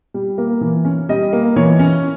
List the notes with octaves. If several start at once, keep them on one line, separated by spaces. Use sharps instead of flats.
G3
A#3
E3
C#4
G3 D#5
A#3
E3 C#5
C#4